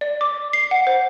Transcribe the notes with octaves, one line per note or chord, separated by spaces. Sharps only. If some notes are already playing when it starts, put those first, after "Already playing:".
D5
D6
C7
F#5
C5